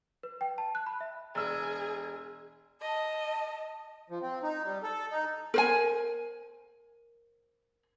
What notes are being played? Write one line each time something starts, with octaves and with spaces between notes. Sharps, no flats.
B4
G5
A5
F#6
B5
E5
E1 G#4 E6
D#5 A5
F3
C4
D#4
G3
A4
D#4
A#4 C5 G#5